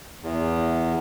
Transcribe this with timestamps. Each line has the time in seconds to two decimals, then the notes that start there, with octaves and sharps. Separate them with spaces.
0.23 E2